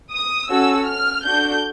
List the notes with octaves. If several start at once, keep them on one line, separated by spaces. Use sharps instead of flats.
D#6
C#4 F#4 A4 E6
F6
D4 F#4 A4 G6